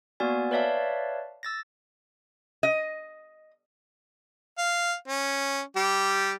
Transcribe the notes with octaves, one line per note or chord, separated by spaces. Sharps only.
A#3 B3 F#4 D5 G#5
B4 C#5 D5 E5 F5 A5
E6 A6 A#6
D#5
F5
C#4
G3 G4